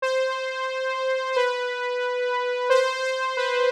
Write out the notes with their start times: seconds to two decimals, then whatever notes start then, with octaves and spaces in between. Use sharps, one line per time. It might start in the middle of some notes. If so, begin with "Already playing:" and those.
0.02 C5
1.32 C5
1.36 B4
2.70 C5
3.03 C5
3.37 B4